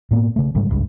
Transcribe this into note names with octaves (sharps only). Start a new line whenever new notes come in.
A2 A#3 B3
C#3 A3
G#2 C#3 G3 G#3
G#1 C#2 G2